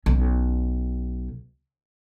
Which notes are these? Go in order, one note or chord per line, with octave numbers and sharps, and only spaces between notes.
B1 C#4